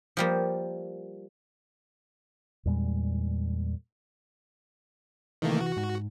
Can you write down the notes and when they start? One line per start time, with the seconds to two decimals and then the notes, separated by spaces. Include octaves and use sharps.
0.17 F3 G3 A#3
2.66 E2 A#2 G3 G#3
5.42 C3 D#3 E3 A3 A#3
5.61 F#4
5.77 G#2